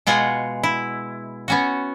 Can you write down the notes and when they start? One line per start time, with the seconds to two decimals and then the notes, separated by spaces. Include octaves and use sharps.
0.07 B2 G#3 F4 F#5 G#5
0.63 E4
1.48 B3 C#4 F#4